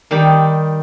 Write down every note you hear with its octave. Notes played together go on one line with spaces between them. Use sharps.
D#3 G3 D#4 G4